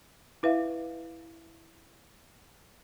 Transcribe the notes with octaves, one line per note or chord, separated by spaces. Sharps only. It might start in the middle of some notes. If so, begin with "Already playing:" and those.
E4 B4 E5 F5